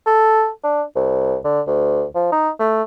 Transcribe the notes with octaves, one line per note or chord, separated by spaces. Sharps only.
A4
D4
C2
D3
D2
F3
D#4
A3